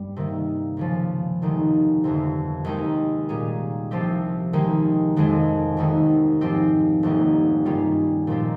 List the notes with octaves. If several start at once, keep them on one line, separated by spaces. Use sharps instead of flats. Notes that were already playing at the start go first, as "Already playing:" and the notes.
Already playing: G2 G3
C3 D#3 A#3
C#2 C#3 F3
F1 D#2 D#3 G#3
G1 F2 C3
D#2 D#3 G#3 D#4 A#4
A#2 G3 C#4 G#4
C2 C3 F3 C4 G4
D#2 D#3 G#3
F1 F2 D#3 G#3
F1 D#2 D#3
G#2 F3 C4 G4
F1 D#2 D#3 G3 A#3
G2 D#3 G3 C#4 F4
A#2 F3 G#3 C4 G4